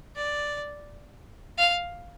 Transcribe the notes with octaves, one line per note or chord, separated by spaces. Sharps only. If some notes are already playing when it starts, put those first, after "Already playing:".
D5
F5